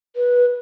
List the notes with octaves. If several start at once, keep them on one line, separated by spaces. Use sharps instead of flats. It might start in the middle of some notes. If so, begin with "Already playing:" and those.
B4